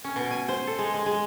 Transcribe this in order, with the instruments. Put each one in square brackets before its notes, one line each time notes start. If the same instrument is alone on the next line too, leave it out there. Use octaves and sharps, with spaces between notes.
[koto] C#4
B2
G#5
C5
A4
G#3
G#3
G#3